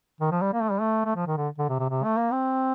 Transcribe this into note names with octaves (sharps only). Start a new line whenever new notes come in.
D#3
F3
G3
A#3
A3
G3
A3
A3
F3
D#3
D3
D3
C3
C3
C3
A3
A#3
C4